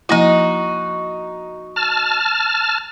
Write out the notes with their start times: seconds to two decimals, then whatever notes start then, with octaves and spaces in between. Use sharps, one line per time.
0.09 F3 A#3 D#4 E4 F#4
1.76 A5 F6